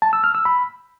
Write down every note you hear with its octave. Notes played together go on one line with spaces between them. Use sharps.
A5
E6
F6
E6
B5